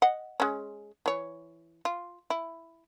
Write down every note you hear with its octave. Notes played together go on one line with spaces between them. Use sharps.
D#5 F#5
G#3 C#4
E3 C#5
F4
E4